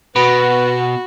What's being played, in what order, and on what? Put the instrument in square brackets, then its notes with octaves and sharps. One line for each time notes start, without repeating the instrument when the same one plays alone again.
[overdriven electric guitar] B2 [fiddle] F#4 [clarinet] B4 [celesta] B5